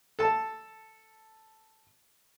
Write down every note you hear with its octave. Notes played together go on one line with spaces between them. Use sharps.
A4 A5